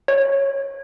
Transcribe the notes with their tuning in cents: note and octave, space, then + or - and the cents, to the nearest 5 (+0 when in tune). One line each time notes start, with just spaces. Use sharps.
C#5 -15